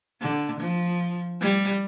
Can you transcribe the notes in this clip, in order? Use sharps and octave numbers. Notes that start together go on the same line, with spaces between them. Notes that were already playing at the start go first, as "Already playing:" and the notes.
D3
F3
G3